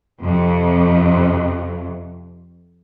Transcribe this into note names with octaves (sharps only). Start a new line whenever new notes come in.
F2 C3